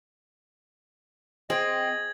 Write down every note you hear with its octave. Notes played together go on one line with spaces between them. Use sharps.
C4 G#4 D#5 G#6 F#7